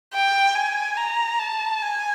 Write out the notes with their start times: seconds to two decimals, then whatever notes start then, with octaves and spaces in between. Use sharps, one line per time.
0.13 G5
0.55 G#5
0.97 A#5
1.39 A5
1.82 G#5